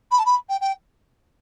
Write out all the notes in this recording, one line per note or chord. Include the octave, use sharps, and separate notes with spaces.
B5
A5
B5
G5
G5